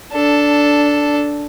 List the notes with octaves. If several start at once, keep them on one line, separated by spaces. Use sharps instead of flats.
D4 A4